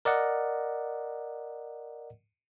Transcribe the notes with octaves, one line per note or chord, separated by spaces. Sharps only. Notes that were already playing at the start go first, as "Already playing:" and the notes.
A#4 D5 D#5 F#5